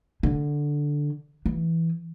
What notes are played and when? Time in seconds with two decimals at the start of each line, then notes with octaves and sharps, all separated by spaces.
0.23 D3
1.46 E3